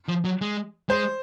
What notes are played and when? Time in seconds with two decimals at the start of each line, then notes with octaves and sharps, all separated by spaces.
0.08 F3
0.25 F#3
0.41 G#3
0.89 G#3 C5